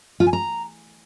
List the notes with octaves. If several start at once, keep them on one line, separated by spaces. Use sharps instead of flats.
F4
G#5
A#5